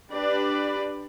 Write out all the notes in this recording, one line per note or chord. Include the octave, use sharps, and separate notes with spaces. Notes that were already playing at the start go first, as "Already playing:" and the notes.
D4 G4 B4 D5